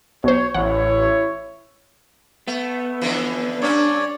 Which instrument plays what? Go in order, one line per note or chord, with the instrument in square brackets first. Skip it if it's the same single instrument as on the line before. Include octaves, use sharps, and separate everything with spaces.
[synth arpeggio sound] B1 C5 [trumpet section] C#5
[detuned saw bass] A1 [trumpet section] E4 C#5 [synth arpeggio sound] F#5
[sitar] A3 [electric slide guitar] B3
[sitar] F2 D3 E3
[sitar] G2 C#4 [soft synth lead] D4 [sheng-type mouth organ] C#5 D5